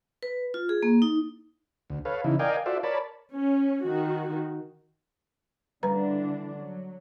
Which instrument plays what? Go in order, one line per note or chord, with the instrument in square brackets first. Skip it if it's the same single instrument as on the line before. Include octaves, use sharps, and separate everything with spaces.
[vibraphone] B4
F4
G#4
A#3
D#4
[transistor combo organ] D2
A4 B4 C#5 F5
C#3 E3 D#4 E4
A#4 D5 D#5 F5 G5 G#5
F4 F#4 A4 C5 D5 E5
A#4 C#5 D5 A5 B5
[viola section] C#4
D#3 F#4
[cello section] D3 E3 D4 [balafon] G3 B4 A#5
[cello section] F#3